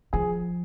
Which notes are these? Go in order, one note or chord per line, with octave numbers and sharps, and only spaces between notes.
F3 G#4